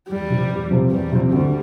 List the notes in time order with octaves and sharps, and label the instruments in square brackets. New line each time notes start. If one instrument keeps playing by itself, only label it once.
[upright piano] E2 [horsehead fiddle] G3
[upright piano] C3 F3 C4
E2
C3 F3 C4
[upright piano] E2 [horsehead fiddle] G3
[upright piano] C3 F3 C4
[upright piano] D2 [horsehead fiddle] G3